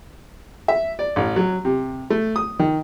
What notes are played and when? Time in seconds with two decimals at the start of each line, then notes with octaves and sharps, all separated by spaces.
0.68 E5
0.99 D5
1.16 A1
1.36 F#3
1.65 C3
2.10 A3
2.36 D#6
2.59 D#3